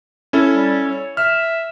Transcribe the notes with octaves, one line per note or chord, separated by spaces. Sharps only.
C#4 E4 A4
G3
C#5
E5 F6